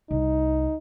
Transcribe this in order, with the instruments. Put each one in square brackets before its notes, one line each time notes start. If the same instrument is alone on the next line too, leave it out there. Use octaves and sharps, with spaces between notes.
[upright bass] C2 [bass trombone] D#4